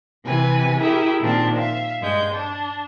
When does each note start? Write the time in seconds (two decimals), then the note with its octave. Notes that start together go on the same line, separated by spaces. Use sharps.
0.24 C3 E3 B4 G#5
0.79 E4 G4 G#4 A#4 E5
1.20 A#2 D#3 F3 C4 D4
1.59 E5 F5
2.01 G2 G#3 G6
2.33 D4